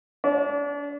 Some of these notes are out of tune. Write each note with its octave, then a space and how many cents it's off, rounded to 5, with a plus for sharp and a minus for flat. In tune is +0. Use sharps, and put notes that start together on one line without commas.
D4 -35